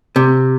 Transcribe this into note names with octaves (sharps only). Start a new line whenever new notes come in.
C3